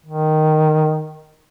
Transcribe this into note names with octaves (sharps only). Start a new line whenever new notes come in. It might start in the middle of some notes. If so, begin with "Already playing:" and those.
D#3